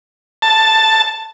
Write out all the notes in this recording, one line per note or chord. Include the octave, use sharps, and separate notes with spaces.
A5